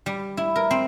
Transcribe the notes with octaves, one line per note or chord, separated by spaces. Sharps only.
G3
E4
A#4
C4